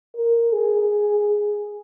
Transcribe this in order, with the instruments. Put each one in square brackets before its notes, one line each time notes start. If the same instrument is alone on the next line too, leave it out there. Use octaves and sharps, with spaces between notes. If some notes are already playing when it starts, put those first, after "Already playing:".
[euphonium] A#4
G#4